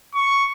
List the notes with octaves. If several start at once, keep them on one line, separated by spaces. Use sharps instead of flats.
C#6